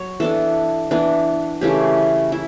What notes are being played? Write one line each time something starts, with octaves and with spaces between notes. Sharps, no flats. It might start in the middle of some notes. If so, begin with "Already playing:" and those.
Already playing: F#3 C#5
E3 B3 D4 A4
E3 B3 D4
C#3 E3 A3 C#4 G4
E4